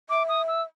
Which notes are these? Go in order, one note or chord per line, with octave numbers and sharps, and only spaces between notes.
E5 D6
D#6
E6